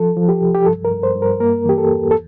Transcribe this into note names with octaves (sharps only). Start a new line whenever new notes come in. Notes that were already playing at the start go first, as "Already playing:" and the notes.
Already playing: F3 A4
F3
G4
C2
G4
G2 A4
A#4
G2
C5
G2
A#4
A#3 A#4
E3 G4
A4
E2
A4